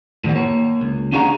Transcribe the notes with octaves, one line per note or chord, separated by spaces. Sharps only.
A2 D#3 G3 B3
A#3 C#5
C#2
C#4 D4 F#4 G#4 F5 A#5